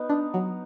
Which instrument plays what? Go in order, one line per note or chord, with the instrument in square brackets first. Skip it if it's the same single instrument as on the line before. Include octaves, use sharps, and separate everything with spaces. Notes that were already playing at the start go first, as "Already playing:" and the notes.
Already playing: [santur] B3 D#4
[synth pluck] D4
F#3